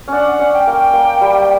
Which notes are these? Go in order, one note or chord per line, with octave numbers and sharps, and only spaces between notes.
C#4 D4 F#5
F#5
C#4
G5
A#3
G5
A#3
G3